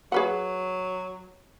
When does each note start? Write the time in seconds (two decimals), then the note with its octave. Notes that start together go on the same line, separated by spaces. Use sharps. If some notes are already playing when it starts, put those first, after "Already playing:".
0.12 F#3 G#4 B4 F#5